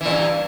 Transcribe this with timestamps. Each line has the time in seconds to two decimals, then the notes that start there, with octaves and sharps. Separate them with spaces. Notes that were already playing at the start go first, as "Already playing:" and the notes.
0.01 E3
0.06 A#2
0.10 G2